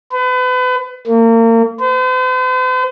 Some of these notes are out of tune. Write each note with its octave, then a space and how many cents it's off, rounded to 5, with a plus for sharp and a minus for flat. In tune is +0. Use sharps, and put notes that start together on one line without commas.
B4 +35
A#3 -35
C5 -45